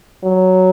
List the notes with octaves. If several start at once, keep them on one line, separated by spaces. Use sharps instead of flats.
F#3